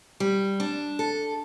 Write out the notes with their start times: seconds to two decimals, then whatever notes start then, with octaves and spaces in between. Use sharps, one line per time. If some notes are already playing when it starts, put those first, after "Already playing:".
0.20 G3
0.60 D4
0.99 A4